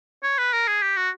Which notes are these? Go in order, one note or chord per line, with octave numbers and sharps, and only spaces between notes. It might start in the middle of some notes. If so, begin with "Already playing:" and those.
C#5
B4
A#4
G#4
G4
F#4